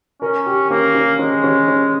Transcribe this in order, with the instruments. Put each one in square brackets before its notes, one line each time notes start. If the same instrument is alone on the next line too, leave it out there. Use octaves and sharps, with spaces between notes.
[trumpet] C#4 [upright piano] A#4
[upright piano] G4
[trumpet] A#3 [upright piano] C#4
[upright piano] C#4
[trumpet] G#3 [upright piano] C#4
[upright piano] C#4
C#4